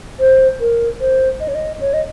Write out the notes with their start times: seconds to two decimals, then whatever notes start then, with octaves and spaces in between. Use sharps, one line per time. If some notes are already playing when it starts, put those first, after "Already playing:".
0.20 C5
0.60 A#4
1.01 C5
1.40 D#5
1.48 C#5
1.55 D#5
1.81 C#5
1.94 D#5